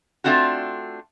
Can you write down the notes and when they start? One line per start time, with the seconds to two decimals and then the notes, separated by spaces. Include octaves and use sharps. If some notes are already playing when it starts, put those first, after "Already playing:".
0.24 A3 C4 D4 F4 F#4